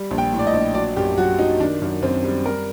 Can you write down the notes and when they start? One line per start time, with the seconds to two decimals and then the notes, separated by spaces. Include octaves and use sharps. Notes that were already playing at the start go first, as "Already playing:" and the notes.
Already playing: G3
0.11 A#1
0.18 G5
0.33 A2
0.39 D5
0.47 D#5
0.53 A#1
0.75 F#3 D5
0.96 F#2 G4
1.17 F#3 F#4
1.39 F#3 D#4
1.60 D#3 D4
1.82 F#2
2.02 F#2 C4
2.24 G3
2.45 G3 A#4